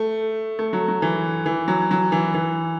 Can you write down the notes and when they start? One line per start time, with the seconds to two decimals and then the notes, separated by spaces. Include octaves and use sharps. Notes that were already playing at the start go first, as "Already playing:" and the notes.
Already playing: A3
0.59 A3
0.73 F#3
0.88 F#3
1.02 E3
1.46 E3
1.68 F#3
1.91 F#3
2.12 E3
2.34 E3